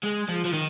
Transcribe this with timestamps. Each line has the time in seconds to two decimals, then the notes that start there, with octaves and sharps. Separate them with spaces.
0.03 G#3
0.29 F3
0.45 F3
0.53 D#3